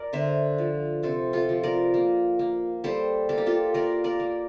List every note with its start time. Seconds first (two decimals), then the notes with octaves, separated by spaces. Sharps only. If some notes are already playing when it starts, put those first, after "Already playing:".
Already playing: A#4 D5
0.13 D3 C5 E5
0.58 F3
1.03 C3 A4 C5
1.33 F4 A4
1.49 F3
1.63 A#4 D5
1.94 A#3
2.39 A#3
2.84 G3 A4 C5
3.29 A#3 A4
3.38 G4
3.46 F4 A4
3.74 A#3 A#4 D5
4.04 A#4 D5
4.20 A#3